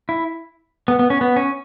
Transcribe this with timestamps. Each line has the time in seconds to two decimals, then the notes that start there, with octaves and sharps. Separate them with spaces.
0.09 E4
0.88 B3
0.99 B3
1.10 C#4
1.21 B3
1.36 C#4